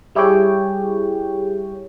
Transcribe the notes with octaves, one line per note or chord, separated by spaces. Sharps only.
G3 E4 G4 G#4 C#5 G5